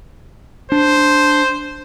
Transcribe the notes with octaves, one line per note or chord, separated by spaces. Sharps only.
D4 C5